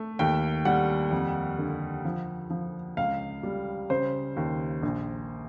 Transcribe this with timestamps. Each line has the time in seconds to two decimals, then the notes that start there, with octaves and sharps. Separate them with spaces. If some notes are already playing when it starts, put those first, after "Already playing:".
Already playing: A3
0.19 D#2 G5
0.65 G3 F#5
1.11 F2
1.58 D3
2.05 F3
2.50 F3
2.97 C#2 F5
3.43 G3
3.90 C#3 C5
4.36 D#2
4.83 A#1